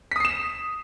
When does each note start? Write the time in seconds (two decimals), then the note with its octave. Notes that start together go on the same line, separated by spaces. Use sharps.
0.11 B6
0.16 D#6
0.20 C7
0.25 E7